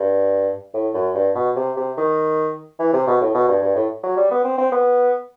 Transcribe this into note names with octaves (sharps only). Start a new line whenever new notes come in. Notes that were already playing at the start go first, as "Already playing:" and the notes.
Already playing: G2
A2
F#2
G2
B2
C3
C3
D#3
E3
C3
B2
A2
B2
G2
G2
A2
F#3
G3
B3
C4
C4
B3